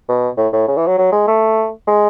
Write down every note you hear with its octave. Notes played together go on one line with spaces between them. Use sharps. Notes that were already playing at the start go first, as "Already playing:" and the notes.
B2
A2
A2
C#3
E3
F#3
F#3
G#3
A3
G#3